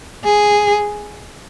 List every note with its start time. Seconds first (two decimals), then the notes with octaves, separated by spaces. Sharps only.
0.25 G#4